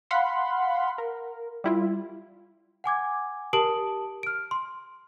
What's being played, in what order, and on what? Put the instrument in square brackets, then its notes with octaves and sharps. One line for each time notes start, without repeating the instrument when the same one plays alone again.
[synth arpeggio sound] F5 F#5 B5 C6
A#4
G3 E4 F4
[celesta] F#5 G#5 D6 G#6
G4 A#4 A5 D#6 D7 F#7
F6 D7
C6